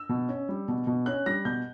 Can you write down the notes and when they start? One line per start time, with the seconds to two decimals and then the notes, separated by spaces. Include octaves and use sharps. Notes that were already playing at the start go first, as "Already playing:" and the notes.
Already playing: E6
0.09 B2
0.28 C#4
0.49 G3
0.68 B2
0.87 B2
1.06 C#4 F#6
1.26 G3 A#6
1.45 B2 G6